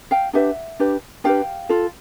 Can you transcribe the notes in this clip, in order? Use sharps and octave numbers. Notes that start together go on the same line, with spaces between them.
F5 G5
D4 G4 B4 E5 F#5
D4 G4 B4
D4 G4 B4 F5 G5
F4 A4